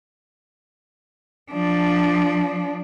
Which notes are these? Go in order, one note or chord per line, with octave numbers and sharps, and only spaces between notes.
F3 D4